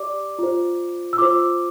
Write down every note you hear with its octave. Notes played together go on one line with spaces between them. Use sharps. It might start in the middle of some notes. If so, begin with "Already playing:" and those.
Already playing: G4 D5 D6
F4 C5
E6
F4 C5 D6